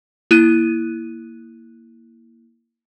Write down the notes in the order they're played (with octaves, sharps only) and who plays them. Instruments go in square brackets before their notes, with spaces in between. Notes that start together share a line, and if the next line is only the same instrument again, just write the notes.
[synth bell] A#3 E4 F#6 D#7